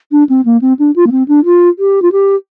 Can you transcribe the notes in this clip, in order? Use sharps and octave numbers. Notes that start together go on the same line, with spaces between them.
D4
C4
A#3
C4
D4
F4
A#3
C4
D4
F4
G4
F4
G4